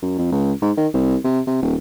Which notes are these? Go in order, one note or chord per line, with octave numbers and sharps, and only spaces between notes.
F#2
F2
C#2
G#2
D#3
C2
C3
C3
D#1